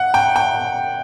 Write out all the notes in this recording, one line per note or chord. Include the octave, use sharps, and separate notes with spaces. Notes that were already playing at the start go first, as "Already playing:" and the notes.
Already playing: F#5
G5
G5